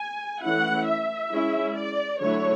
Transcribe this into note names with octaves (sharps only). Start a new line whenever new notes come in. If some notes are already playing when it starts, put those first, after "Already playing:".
Already playing: G#5
E3 A3 C#4 E4 F#5
E5
G#3 C#4 E4
D5
D3 F#3 A3 E4 C#5